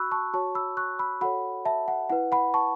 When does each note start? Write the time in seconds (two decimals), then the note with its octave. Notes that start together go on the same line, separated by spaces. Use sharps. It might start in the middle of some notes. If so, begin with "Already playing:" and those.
Already playing: F#4 B5 C#6 E6 F#6
0.11 A5 C#6
0.34 F#4 C#5 A5 C#6
0.55 B5 E6
0.77 C#6 F#6
0.99 B5 E6
1.21 F#4 A4 C#5 F#5 B5
1.65 E5 A5
1.88 F#5
2.10 E4 B4 F#5
2.32 F#5 B5
2.54 A5 C#6